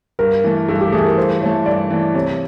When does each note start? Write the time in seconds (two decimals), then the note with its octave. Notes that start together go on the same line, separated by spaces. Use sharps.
0.19 G2 A#4
0.44 E3 A3
0.68 G2 A4
0.81 G4
0.92 E3 A3 G#4
1.05 A#4
1.17 G2 C5
1.42 E3 A3 C#5
1.65 G2 D5
1.90 E3 A3
2.14 C3 C#5